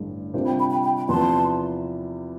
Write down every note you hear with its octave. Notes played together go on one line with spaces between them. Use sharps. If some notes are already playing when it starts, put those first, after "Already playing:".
Already playing: A1 G2 D3 G3
C3 G3 D4 F4 C5
G5 B5
G5 B5
G5 B5
G5 B5
G5 B5
E2 C3 F3 B3 A5 C6